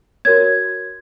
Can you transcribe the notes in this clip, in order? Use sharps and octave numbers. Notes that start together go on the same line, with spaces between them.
F#4 A#4 C#5 G#6